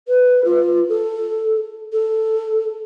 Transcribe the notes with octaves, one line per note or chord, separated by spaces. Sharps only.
B4
F4
A4
A4